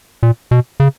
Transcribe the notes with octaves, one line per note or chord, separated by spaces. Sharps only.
A#2
B2
C#3